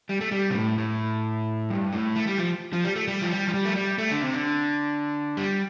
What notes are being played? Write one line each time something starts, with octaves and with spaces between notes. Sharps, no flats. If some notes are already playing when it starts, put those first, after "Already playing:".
G3
A3
G3
C3
A2
A2
G2
A2
A3
G3
F3
F3
G3
A3
G3
F3
G3
F3
G3
A3
G3
A3
D3
C3
D3
G3